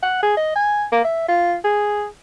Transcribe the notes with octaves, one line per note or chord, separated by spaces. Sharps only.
F#5
G#4
D#5
G#5
A#3
E5
F4
G#4